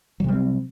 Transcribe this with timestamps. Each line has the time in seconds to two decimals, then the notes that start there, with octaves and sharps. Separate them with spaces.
0.20 F#3
0.24 C3
0.28 G3
0.32 C4